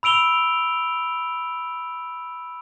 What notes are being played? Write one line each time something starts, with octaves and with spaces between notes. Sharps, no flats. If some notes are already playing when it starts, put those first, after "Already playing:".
B5 E6 D7 F7 G7